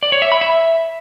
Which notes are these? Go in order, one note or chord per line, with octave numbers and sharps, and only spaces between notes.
D5
C#5
E5
B5
E5